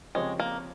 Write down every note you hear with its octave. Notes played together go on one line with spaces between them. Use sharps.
C#3 F3 G#3 C4 G4 C#5
A#3